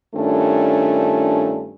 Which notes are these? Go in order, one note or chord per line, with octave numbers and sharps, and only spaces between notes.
G2 D#3 A3 C#4 D4 F4